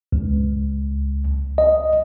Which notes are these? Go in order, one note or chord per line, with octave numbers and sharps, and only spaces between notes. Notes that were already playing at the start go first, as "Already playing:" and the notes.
C#2
D#5